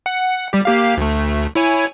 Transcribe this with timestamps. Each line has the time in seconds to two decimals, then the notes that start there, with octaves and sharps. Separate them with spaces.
0.06 F#5
0.53 G3 G4
0.65 A#3 G4 F5
0.97 D2 A3
1.55 E4 C#5 G#5